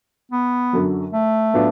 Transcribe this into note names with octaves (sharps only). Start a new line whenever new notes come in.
B3
F#2 D3 F#3
A3
A2 F#3 B3 D4 F4